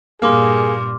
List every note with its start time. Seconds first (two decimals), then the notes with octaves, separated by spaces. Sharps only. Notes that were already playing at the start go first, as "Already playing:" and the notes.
0.22 G2 A#2 A#3 G#4 C6 D6 F6